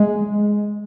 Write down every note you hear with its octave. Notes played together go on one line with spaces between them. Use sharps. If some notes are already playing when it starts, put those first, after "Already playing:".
Already playing: G#3